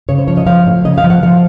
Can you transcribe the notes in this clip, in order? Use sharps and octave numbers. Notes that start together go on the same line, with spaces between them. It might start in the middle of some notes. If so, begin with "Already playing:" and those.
C#3 C#5
C5
F3 C#5
D#5
F3 F5
A2
C#3 D#5
F5
F3
F#5
F3 F5